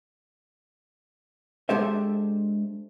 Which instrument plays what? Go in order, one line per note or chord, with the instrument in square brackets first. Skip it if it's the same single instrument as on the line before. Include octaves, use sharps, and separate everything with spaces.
[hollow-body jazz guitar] G#3 D4 G4 A4 C5 E5